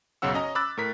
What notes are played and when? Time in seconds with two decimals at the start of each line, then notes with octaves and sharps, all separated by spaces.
0.22 B1 F#2 C#3 C#4 F#5 E6
0.34 C#4 D#5 A#5
0.55 B5 D6 E6 F#6 A6
0.77 A2 A#4 B6